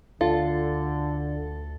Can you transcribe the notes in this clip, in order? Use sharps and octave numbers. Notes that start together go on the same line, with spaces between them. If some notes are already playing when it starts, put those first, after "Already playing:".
D2 D3 F4 A4